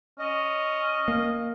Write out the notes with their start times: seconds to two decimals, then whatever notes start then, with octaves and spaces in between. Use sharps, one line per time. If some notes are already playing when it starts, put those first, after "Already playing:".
0.19 C#4 D#5
1.08 A#3